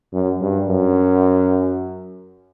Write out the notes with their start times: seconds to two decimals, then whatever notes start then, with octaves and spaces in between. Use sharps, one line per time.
0.13 F#2
0.40 G2
0.69 F#2